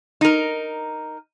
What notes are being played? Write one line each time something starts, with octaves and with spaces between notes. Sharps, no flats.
D#4 A#4